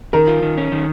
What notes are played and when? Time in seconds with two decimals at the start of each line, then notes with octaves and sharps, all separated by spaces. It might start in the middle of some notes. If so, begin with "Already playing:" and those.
0.13 D#3 A#4
0.27 F4
0.42 D#3
0.58 C#4
0.72 D#3